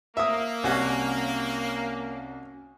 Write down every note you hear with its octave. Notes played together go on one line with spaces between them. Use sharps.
A#3 E5 D#6
C2 C#4 F#4